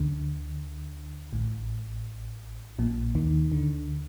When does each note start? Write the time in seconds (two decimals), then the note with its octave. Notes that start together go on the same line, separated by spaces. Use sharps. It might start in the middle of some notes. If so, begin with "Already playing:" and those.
Already playing: D2 D3
1.32 A1 A2
2.79 A#1 A#2
3.15 D#2 D#3
3.52 D2 D3